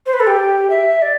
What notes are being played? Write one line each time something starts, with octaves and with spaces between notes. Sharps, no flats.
C5
B4
A4
G4
E5
D5